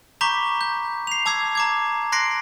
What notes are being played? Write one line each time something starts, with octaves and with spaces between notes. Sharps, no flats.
A#5 B5 C#6 D6 G6 B6
G6
C7 F7
A5 D6 E6 G#6 C7
A#5 D6 G#6
C6 F#6 A#6 C7 D7